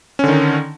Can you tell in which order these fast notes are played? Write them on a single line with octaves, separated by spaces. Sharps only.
C#4 D3 D#3 D#4